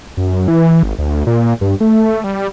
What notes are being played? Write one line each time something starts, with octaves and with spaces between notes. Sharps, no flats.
F#2
E3
G#1
D2
A#2
G2
A3
G3